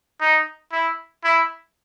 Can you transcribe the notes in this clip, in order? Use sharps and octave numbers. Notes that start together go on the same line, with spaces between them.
D#4
E4
E4